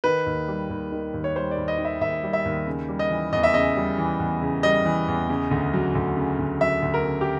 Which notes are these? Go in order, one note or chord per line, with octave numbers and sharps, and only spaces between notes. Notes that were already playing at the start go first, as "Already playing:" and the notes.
D#3 B4
D#2
G3
D#2
D#3
D#2
C#5
G3 C5
D5
D#2
D#5
D#3
E5
D#2 E5
G3
E5
D#2
C#3
G3
D#5
E3
E2 D#5
E5
C#3 D#5
G3
E3
E2
C#3
G3 D#5
E3
E2
C#3
D2
F#3
D2
C#3
D2
F#3 E5
D2
A#4
C#3
G4